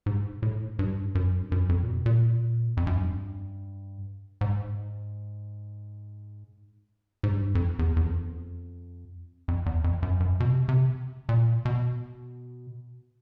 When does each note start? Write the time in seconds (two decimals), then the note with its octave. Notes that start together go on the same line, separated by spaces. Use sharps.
0.06 G#2
0.42 A2
0.79 G2
1.15 F#2
1.42 G2
1.52 F#2
1.69 F2
1.83 A#2
1.88 B2
2.06 A#2
2.77 F2
2.87 F#2
2.97 G2
4.41 G#2
7.23 G#2
7.30 G2
7.55 F2
7.79 E2
7.96 E2
8.03 F2
9.48 F2
9.66 E2
9.84 F2
10.02 F#2
10.20 F#2
10.40 B2
10.44 C3
10.69 C3
11.29 A#2
11.65 B2